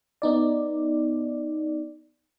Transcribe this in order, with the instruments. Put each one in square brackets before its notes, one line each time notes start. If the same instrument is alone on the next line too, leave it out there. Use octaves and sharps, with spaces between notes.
[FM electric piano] B3 D#4 D5